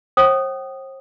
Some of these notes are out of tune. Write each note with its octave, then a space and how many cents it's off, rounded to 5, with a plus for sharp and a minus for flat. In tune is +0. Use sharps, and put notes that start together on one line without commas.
C5 +40 G5 -45 D#6 -10